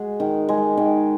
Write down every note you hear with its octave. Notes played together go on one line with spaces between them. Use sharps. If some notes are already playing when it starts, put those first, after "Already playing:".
Already playing: G#3 F#4 G#4
D#3
G#3
D#3